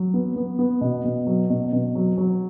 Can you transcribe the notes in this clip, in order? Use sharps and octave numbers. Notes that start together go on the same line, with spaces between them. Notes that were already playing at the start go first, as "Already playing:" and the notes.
Already playing: F#3
B3
B3
B3
B2
B2
F#3
B2
B2
F#3
F#3